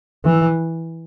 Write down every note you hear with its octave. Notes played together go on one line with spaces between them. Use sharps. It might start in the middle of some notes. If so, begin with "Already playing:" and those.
E3